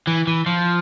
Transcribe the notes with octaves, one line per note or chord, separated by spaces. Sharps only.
E3
E3
F3